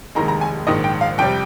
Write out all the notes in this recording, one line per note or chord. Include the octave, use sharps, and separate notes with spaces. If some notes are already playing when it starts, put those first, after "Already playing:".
F1 D#2 D#3 G#3 A#5
A#5
G#5
A#1 G#2 D#3 D#5
G5
F5
F2 C3 G3 G5